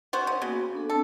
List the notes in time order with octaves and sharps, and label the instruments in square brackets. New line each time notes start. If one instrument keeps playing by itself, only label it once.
[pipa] B3 F#4 C5
C#3
[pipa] C#3 [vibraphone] A#3 B3 F#4
[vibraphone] D4 A4
[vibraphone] B3 C4 [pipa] A4